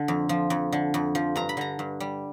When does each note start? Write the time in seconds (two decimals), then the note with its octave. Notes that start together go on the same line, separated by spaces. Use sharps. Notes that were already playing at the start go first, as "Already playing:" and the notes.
Already playing: D3
0.08 F2
0.29 F3
0.50 F2
0.72 D3
0.94 F2
1.15 F3
1.36 G2 A#5
1.49 B5
1.57 D3 A#5
1.79 G2
2.00 G3